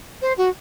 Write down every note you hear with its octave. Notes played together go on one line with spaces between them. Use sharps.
C5
F#4